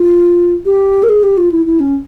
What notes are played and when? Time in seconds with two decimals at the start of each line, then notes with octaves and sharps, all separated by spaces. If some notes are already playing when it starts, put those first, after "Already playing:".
Already playing: F4
0.66 G4
1.03 A#4
1.09 G#4
1.23 G4
1.38 F4
1.52 E4
1.66 E4
1.80 C#4